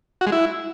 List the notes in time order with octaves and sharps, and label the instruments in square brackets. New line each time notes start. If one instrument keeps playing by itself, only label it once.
[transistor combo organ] F#4
G#3
E4